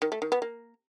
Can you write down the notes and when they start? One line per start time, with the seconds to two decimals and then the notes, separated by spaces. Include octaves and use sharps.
0.02 D#3
0.12 A3
0.22 D#3
0.32 B3
0.42 A#3